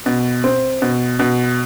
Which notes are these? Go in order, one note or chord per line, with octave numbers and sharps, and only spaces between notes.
B2
C4
B2
B2